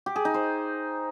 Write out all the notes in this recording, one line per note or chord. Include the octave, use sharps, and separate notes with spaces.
G4
G#4
D#4
C5